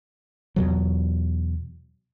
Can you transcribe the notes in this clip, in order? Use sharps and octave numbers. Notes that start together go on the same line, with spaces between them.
E2 B2 F#3